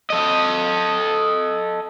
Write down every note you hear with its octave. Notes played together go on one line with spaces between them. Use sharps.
A4 D#5